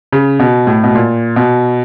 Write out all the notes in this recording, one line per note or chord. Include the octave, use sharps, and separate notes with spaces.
C#3
B2
A2
B2
A#2
B2